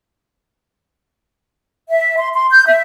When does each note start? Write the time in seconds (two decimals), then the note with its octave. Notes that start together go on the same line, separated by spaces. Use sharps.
1.89 E5
2.18 C6
2.33 C6
2.50 G6
2.66 E5